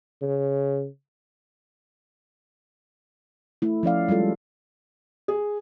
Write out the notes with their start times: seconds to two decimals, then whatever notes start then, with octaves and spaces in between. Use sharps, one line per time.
0.22 C#3
3.62 A3 E4
3.83 F3 C#4 D5 F5
4.09 G3 G#3 F4 A4
5.28 G#4